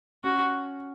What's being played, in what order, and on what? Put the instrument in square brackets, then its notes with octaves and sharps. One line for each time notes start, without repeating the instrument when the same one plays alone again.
[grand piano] C#4 [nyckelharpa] F#4